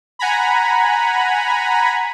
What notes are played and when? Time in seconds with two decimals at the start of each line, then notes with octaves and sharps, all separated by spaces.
0.19 F#5 G#5 A#5 B5